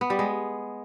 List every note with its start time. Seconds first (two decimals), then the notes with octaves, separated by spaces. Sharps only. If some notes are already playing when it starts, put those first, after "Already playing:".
0.01 B3
0.10 G3
0.19 G#3